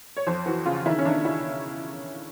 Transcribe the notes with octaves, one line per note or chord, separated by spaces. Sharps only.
C#5
F2 C5
E3 F#4
C#3 F4
D#3 E4
C#4
D#3 D4
E4